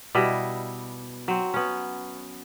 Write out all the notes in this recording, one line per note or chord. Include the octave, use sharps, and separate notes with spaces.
B2 G3 E4 D#5
F#3 C4
B3 C#4